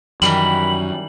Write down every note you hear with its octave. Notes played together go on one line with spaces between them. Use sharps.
F#2 D#3 E3 G3 B5 F#7